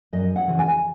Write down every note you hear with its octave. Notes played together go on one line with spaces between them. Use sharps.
F#2 D#5
F#5
C#3 E3
G#5